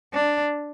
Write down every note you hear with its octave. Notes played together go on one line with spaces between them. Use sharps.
D4